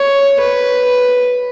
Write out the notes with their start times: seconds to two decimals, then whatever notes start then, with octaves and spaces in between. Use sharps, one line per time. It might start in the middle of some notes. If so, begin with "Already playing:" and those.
Already playing: C#5
0.40 B4